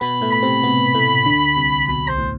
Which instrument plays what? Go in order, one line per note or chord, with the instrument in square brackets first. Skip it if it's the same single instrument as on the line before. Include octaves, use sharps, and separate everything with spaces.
[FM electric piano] B2 B3 [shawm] B5
[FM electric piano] A2 A3
[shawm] B5
[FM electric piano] C3 C4
B2 B3
A2 A3
D2 D3
C2 C3
[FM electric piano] B1 B2 [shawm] B5
[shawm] C5
[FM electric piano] A2